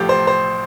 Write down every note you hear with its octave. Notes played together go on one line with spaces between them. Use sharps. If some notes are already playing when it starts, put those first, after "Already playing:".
Already playing: A1 A2 F3 G4 A4
C5
C5